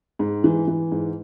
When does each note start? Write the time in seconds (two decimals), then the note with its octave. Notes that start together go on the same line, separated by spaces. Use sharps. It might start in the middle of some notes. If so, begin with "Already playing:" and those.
0.19 G#2
0.44 E3
0.68 E3
0.92 G#2